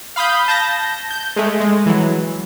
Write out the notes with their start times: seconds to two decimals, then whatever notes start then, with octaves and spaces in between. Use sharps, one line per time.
0.16 F5 B5 D#6 G6
0.48 A5 G6 A#6
1.11 G6
1.36 G#3 A3
1.60 G#3
1.86 E3 F#3